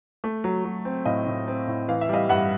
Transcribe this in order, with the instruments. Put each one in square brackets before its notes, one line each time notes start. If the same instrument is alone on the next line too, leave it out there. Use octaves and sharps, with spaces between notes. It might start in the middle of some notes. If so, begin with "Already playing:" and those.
[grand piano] A3
F#3
F#3
C4
A2 D#5 F5
A2
C4
A2
E3 F5
E5
G3 D#5 F5
G2 E5 F#5